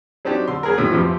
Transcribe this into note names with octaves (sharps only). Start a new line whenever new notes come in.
F#3 C4 D4 D#4 G4
D3 C6
F#3 G#4 A#4
A2 D#3 G#3
F2 C3 E3 F3